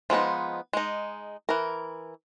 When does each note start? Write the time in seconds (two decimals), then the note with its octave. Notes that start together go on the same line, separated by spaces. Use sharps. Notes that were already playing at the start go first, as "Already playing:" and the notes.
0.10 F3 G#3 B3 D#4
0.73 G#3 D#4
1.49 E3 A#4